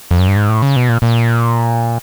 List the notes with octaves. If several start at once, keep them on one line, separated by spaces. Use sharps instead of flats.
F2
F#2
G2
G#2
A2
C#3
B2
A#2
A#2